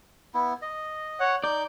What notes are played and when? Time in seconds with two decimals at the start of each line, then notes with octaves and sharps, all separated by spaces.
0.34 B3 E4
0.62 D#5
1.20 C#5 F#5
1.44 D#4 D5 G6